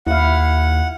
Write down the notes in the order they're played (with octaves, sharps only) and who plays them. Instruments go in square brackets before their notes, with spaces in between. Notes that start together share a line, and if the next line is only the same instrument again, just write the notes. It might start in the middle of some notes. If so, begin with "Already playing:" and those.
[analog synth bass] D#2 [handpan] E4 F5 [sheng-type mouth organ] F#5